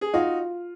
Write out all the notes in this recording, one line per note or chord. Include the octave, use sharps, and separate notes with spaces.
G#4
D#4 F4 F#4